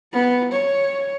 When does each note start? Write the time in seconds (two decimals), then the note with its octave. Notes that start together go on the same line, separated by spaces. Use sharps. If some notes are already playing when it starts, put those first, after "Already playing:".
0.13 B3
0.52 C#5